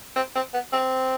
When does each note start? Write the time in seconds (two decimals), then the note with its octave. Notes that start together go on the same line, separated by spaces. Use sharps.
0.16 C4
0.36 C4
0.54 B3
0.73 C4